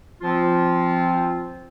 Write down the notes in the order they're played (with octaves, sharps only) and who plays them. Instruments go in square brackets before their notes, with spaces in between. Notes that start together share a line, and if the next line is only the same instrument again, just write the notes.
[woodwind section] F3 C4 F4